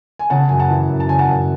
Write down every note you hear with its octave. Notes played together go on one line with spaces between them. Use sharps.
G#5
C#3 F#5 A5
F#2 G#5
F#5 A5
E3
F#2
A5
C#3 G#5
F#5 A5
F#2